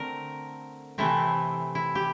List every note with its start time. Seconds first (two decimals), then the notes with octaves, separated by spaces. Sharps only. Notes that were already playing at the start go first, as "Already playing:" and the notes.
Already playing: D3 A3 C4 A#4
0.98 C3 E3 A3 C4 E4
1.75 E4
1.95 G4